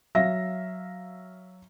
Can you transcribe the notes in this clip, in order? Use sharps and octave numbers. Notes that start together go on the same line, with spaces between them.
F#3 E5 F5 A#6